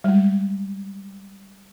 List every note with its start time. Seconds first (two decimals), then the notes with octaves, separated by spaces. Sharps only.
0.04 G3 G#3